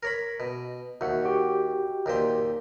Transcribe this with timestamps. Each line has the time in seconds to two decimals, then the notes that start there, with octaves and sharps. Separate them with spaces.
0.03 A#4 C#5 B5
0.40 B2
1.01 D#2 F#4 E5 F#5
1.25 F#4 G4 G5
2.06 D#2 A#2 C5